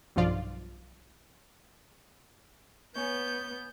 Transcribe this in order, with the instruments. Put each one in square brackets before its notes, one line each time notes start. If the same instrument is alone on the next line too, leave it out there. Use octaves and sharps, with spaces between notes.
[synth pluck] B1 G2 F3 F4 D5
[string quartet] B3 [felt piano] C#5 G#5 [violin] G6